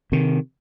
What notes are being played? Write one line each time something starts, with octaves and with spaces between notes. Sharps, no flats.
C3 D#3